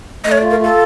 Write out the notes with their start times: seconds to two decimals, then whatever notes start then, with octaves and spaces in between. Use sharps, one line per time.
0.24 A3 D#5
0.32 C#5
0.38 D5
0.42 F4
0.50 A#4
0.60 F4 A4